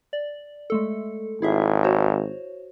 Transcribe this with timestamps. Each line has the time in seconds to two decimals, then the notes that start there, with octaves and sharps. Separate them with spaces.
0.13 D5
0.70 G#3 A3 A4
1.42 G#1 E4 G#4 E5
1.84 F#4 C5 C#5